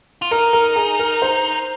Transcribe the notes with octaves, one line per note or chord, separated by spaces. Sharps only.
F4
D#4 A#4
A#4
G#4
A#4
C5